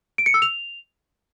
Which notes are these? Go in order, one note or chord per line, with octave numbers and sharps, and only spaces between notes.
D7
C#7
E6
F7